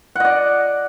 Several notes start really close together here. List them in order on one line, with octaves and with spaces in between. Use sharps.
F#5 D#5 D5